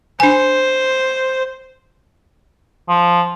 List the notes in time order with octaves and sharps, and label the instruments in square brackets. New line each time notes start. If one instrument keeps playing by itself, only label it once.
[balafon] D4 G#5 [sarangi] C5
[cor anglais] F3